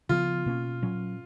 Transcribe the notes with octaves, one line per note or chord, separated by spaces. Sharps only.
C#3 F3 B3 F4
B2 A#3 C#4
A#2 F#3 C#4